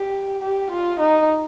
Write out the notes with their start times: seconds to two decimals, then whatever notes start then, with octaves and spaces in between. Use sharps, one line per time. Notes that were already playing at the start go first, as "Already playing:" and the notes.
Already playing: G4
0.42 G4
0.70 F4
0.99 D#4